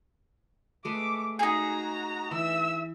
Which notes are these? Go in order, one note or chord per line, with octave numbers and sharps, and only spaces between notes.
G#3 A3 B4 D6
D#4 F#4 G#4 A#5
E3 E5 E6